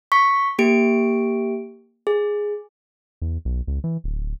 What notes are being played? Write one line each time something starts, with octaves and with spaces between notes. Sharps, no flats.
C#6 B6
A#3 G4 D7
G#4
E2
B1
C#2
E3
D1